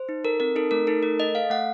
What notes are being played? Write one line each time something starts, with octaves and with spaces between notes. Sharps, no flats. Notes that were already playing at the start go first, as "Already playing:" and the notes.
Already playing: C5
D#4
A4 A#4
C4 A#4
D#4 A4
A3 A#4
D#4 A4
A3 A#4
A4 D#5
A4 F5
A3 F#5